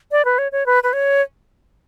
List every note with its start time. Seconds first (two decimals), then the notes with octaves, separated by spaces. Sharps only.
0.12 D5
0.25 B4
0.38 C#5
0.52 C#5
0.66 B4
0.83 B4
0.93 C#5